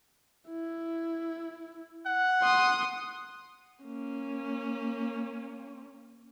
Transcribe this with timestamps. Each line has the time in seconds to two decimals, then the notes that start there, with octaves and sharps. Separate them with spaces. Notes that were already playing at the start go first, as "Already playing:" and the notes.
0.49 E4
2.06 F#5
2.43 C6 D#6
3.84 A#3 C#4